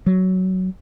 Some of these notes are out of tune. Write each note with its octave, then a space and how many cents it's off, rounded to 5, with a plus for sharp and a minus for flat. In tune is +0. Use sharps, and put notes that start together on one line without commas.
F#3 +10